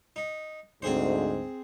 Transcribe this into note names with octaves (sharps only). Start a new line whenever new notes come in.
D#4
D2 G#2 C4 G#4 C5